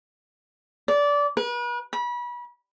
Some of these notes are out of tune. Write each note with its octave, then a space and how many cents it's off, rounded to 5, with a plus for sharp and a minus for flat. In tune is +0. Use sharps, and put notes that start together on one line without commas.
D5 -20
B4 -40
B5 -30